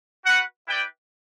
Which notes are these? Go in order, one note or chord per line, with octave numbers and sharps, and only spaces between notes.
F#4 B4 F#5
E4 B4 D5 G5